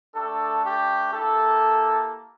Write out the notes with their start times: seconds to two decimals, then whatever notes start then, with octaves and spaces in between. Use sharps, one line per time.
0.15 A3 D4 G4 A4
0.64 G4
1.14 A#3 E4 G4 A4